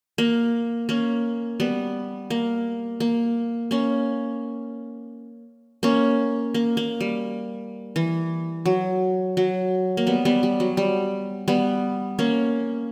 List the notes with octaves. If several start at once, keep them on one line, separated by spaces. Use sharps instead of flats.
A#3
A#3 C#4
G3 B3
A#3
A#3
A#3 C#4
A#3 C#4
A#3
A#3
G3
E3
F#3
F#3
A#3
G3 B3
G3 B3
G3
F#3
G3
G3 B3
A#3 C#4